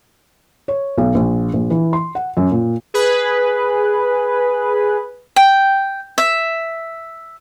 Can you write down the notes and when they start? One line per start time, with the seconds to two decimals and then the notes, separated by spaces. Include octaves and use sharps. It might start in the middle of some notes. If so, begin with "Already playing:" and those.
0.68 C#5
0.98 B1
1.15 A#1
1.54 A#1
1.70 E3
1.93 C6
2.15 F#5
2.37 F#2
2.51 A#2
2.94 G#4 B4
5.36 G5
6.18 E5